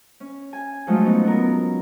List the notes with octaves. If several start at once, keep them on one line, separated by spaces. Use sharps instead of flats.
C#4
G#5
F3 F#3 G#3 A3 D#4 F4
B3 C#4 D#4
B3 A#4